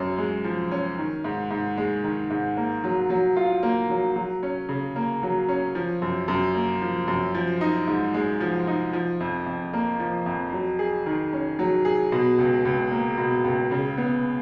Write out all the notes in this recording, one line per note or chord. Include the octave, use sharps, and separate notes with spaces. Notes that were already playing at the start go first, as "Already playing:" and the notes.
Already playing: F#2 C#4
G#3
F3
C#4
D#3
G#2
G#2
G#3
D#3
G#2
A#3
F#3
F#3
F4
A#3
F#3
F#3
C#4
C#3
A#3
F#3
C#4
F3
F#2
F#2
A#3
F3
F#2
F3
D#4
G#2
G#3
F3
D#4
F3
F2
F2
A#3
F3
F2
F#3
G#4
D#3
C#4
F#3
G#4
B2
C#2
C#2
A#3
B2
C#2
C#3
B3